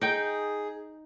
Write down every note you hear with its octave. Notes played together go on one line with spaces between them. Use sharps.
D#4 G#4 G5